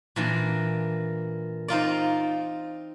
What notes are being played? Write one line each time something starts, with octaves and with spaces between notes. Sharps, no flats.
A#2 E3 D4
C4 D#4 F4 D5